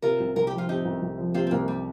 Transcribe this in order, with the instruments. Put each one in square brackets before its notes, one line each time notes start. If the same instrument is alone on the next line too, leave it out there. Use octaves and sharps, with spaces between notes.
[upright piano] C3 [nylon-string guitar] F4 A#4
[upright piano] C2
[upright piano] C2 [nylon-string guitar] A#4
[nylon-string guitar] G4
[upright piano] F3
[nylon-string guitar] F4
[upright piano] C3 [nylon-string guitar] D#4 G4
[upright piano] C2
C2
F3
[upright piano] C3 [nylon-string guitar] C4 F4
[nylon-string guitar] C4
[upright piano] C2 [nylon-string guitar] A#3
[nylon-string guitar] G3